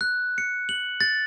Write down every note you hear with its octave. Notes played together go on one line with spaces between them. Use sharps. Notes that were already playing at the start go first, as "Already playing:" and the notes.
F#6
C#7
F#7
A6